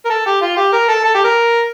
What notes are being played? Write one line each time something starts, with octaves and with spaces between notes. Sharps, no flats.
A#4
A4
G4
F4
G4
A#4
A4
A4
G4
A#4